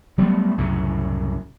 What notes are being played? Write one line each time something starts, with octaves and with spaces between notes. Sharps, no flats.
F#3 G3 A3 B3
C2 F#2 A2 C#3